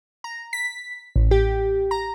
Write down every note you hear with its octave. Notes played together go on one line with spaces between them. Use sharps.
A#5
B6
A1
G4
A#5